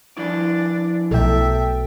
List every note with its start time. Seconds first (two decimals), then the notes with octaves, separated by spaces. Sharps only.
0.17 F3 D4 E4 D5
1.11 B1 B2 A4 E5 G5